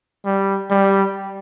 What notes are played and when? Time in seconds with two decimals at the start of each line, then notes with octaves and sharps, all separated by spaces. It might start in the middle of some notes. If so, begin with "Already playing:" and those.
0.25 G3
0.70 G3